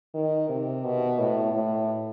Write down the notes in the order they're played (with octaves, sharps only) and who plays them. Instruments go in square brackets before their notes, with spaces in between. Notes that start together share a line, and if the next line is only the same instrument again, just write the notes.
[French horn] D#3
C3
B2
A2
A2